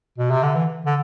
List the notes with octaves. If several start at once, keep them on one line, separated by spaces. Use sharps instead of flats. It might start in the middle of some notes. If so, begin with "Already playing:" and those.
B2
C3
D3
E3
D3